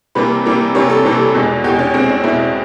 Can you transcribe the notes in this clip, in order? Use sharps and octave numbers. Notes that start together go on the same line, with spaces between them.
C3 E3 G3 A#3 B4
C3 E3 G3 A#3
C3 E3 G3 A#3 C#5
A4
C3 E3 G3 A#3
E2 B2 G#3
E2 B2 G#3 G4
C#4
E2 B2 G#3 C4
C#4
E2 B2 G#3 E4